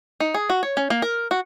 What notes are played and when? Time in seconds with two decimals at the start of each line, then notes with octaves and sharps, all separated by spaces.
0.20 D#4
0.34 G#4
0.50 F#4
0.63 C#5
0.77 C#4
0.90 A#3
1.02 A#4
1.31 F#4